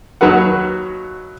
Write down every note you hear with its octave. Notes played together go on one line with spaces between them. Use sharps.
D#2 F#3 F#4 B4 F#5